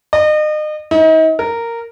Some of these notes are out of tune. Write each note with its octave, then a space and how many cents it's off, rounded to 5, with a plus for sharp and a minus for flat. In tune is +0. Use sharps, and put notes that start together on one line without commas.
D#5 -35
D#4 +40
A#4 -10